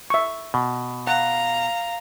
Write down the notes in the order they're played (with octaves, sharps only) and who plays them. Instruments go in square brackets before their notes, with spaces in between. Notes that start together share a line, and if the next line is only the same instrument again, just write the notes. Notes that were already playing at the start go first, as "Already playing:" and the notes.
[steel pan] E5 C#6
[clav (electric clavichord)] B2
[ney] F5 [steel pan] F#5 [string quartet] A#5